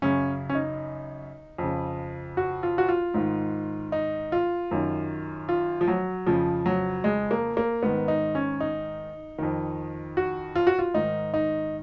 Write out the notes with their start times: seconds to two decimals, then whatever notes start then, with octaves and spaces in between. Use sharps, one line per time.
0.02 F#2 C#3 C#4
0.50 C#4
0.55 D#4
1.58 F2 C#3
2.37 F#4
2.63 F4
2.78 F#4
2.89 F4
3.14 G#2 D#3
3.92 D#4
4.32 F4
4.71 F#2 D#3
5.49 F4
5.81 F3
5.88 F#3
6.26 F2 C#3 F3
6.66 F#3
7.04 G#3
7.31 A#3
7.57 A#3
7.83 G#2 D#3 B3
8.08 D#4
8.35 C#4
8.60 D#4
9.38 F2 D#3
10.17 F#4
10.55 F4
10.67 F#4
10.79 F4
10.94 G#2 D#3 D#4
11.34 D#4